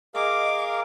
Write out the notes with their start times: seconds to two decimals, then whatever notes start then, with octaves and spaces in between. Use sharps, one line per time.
0.15 G#4 A#4 D#5 F5 D6